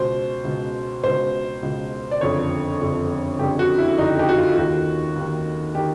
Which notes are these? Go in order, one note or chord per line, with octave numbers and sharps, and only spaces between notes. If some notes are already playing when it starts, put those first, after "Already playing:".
Already playing: C#2 B2 C5
C#2 B2
C#2 B2 C5
C#2 B2
D5
F#1 F2 D3 C#5
F#1 F2 D3
F#1 F2 D3 G4
F#4
E4
F#1 F2 D3 D#4
G4
F#4
F4
D#2 D#3 F#4
D#2 D#3
D#3 G4